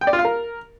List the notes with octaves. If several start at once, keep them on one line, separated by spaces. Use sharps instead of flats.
G5
D5
F4
F5
A#4